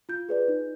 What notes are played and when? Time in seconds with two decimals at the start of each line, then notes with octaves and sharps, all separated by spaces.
0.09 F4 G6
0.29 G#4 B4 D5
0.48 D#4